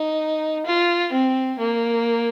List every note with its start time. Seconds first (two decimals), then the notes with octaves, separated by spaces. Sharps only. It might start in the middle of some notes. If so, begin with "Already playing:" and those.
Already playing: D#4
0.67 F4
1.13 C4
1.59 A#3